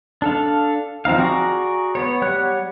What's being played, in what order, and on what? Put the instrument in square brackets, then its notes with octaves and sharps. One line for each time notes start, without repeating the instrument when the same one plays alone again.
[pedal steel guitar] D4 A4 F5
F3 C4 D#4 F5
F#4 G#4 D5 A#5 C#6
B3 C#5
G3 C#5 F#5 F#6